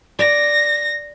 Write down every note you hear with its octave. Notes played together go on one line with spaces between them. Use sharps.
D5 A#6